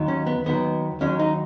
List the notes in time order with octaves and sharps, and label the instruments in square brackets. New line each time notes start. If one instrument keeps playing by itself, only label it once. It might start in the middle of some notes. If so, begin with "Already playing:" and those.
Already playing: [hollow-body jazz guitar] D#2 D#3 F#3
C#4
B3
D#2 D#3 F#3 B3
D#2 D#3 F#3 C#4
D#4